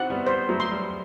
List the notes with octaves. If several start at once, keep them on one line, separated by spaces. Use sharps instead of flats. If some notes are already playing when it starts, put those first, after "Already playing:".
Already playing: C4 D#4 E4 F#4 F#5
G3 B3
G3 C5
F#3 A3
C6
G3